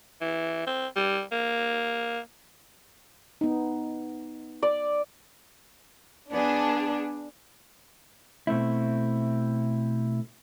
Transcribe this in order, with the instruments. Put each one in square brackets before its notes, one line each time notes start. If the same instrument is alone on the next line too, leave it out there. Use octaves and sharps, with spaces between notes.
[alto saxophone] E3
C4
G3
A#3
[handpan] B3 D#4
[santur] D5
[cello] B3 G#4 [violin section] D4
[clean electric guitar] B2 A3 C4 E4